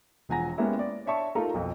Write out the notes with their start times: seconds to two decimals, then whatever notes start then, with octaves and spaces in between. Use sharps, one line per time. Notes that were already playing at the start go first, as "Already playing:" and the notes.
0.29 E1 F3 F#5 G#5 A#5 A#6
0.58 G#3 A#3 B3 C#4 E4 G4
0.79 D5
1.06 D4 C#5 E5 A5 C#6
1.35 A3 D#4 F4 A4 A#4
1.54 B1 F2